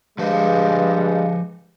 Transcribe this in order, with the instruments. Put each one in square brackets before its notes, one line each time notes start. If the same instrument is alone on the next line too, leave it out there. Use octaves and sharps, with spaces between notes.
[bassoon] G2 [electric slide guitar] F3 B4 C5 [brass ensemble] G#3 F5